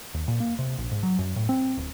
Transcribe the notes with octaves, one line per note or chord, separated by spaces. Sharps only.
D#2
A#2
A#3
C3
A#1
G#2
F#3
F#2
A2
C4
D1